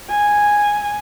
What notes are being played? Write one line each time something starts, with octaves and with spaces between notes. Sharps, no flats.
G#5